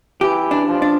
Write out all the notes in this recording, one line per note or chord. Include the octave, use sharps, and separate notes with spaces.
E3 G4
D4
F3
D4